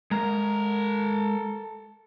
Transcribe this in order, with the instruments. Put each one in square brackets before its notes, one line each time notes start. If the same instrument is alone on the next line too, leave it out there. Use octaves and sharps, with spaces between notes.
[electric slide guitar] G#3 A#4 [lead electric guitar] A4 A#5